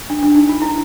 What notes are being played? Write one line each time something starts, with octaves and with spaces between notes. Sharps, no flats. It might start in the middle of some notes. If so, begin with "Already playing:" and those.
D4
D4
D#4
F4
E4